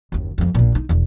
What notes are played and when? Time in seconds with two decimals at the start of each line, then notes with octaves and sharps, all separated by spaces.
0.12 F#1 D#2
0.38 F2 B3
0.54 A#1 A#2
0.72 D#4 E4
0.89 E1 E2